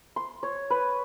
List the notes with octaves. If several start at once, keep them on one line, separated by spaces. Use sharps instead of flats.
C6
C#5
B4